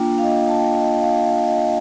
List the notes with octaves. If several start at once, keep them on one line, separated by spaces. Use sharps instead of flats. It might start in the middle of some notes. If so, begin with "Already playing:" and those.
Already playing: A#3 D4 F4 G5
F5
D#5
A5
G5
D#5
F5
F5
D#5